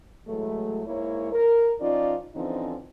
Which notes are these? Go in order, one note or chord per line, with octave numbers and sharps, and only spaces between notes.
A2 E3 F#3 G#3 A3
G#2 A#3 E4 C#5
A#4
F3 C#4 D#4 F4 D5
D3 E3 F3 C4 C#4 D#4